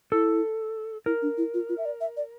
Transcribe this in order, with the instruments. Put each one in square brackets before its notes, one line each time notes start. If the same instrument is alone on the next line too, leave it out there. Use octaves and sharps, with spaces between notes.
[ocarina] E4 [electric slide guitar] A4
[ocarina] E4 [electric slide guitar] A#4
[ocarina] D4
E4
F4
F4
E5
D5
E5
D5